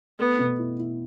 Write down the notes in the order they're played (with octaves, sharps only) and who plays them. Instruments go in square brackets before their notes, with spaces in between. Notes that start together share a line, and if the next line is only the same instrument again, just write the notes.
[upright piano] A3 [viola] B3
[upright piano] B2
E4
E4